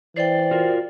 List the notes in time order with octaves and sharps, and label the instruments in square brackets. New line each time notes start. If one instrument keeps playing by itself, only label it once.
[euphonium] E3 [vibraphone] C5 G5 [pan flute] D5
[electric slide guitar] F4 F#4 A#4